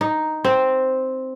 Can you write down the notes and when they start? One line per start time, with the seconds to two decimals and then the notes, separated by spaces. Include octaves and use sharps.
0.01 D#4
0.44 C4